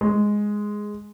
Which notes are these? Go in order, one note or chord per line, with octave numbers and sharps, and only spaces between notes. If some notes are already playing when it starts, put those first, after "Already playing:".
G#3